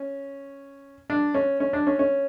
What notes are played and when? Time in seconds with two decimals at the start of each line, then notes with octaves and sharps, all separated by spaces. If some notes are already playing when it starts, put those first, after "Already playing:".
Already playing: C#4
1.10 D4
1.34 C#4
1.60 C#4
1.73 D4
1.87 C#4
1.99 C#4